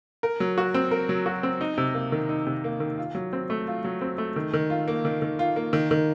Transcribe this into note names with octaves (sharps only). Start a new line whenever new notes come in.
A#4
F#3
F#4
C4
A#4
F#3
F#4
C4
D#4
C3
A#3
D#3
D#4
C3
A#3
D#3
F4
F#3
C4
A3
F4
F#3
C4
A3
D#3
D#3
F4
A#3
D#3
D#3
F4
A#3
D#3
D#3